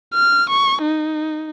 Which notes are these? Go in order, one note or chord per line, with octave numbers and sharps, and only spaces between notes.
F6
C#6
D#4